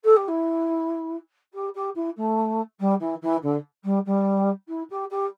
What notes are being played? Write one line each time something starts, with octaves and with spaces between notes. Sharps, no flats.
A4
G4
E4
G4
G4
E4
A3
G3
E3
E3
D3
G3
G3
E4
G4
G4